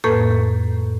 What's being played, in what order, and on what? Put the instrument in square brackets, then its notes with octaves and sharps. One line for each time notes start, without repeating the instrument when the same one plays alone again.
[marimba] F2 A2 A#3 A4 B4 G6